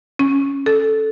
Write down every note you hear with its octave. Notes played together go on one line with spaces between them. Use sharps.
C#4
A4